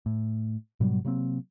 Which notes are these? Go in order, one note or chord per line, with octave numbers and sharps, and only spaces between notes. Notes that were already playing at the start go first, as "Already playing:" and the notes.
A2
G#2 B2 F#3 G3
C3 F#3 A#3 C4